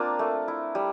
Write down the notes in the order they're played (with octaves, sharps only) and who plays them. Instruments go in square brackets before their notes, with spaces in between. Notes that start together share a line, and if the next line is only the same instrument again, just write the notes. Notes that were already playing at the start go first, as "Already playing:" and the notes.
Already playing: [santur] A#3 C4 D4 F4 A#4
A3
E4
G3